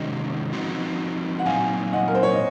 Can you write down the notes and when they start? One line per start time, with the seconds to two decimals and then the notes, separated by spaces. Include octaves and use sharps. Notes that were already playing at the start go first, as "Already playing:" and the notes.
Already playing: C3 D#3 G#3 C#4 F#4 D#5
0.53 F3 C4 D#4 F#4
1.39 F#5
1.46 A#2 F#3 C4 D#4 F5 G#5
1.92 D#5 F#5
2.08 A#4
2.15 C5
2.23 C#5
2.31 D#5